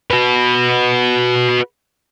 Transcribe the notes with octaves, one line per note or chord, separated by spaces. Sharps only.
F#4 B4